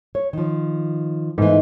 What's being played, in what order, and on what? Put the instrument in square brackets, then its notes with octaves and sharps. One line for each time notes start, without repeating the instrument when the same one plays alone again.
[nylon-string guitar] C#5
D#3 F3
[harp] G#2 [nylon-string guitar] E3 A3 B3